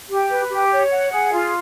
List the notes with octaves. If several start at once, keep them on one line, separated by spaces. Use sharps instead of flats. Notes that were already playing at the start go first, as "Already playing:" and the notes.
G4
B4
G4
C#5
F#5
G#4
F4